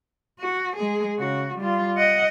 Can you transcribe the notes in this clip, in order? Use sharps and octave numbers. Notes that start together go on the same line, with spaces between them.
F#4
G#3 G#4
C#3 F#4
G3 F4
D#5 F#5